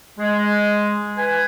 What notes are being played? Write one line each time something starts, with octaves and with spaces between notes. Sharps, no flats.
G#3
B4 G#5